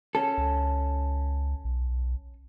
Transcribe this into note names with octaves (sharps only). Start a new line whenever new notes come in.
C#4 A4
C#2
B1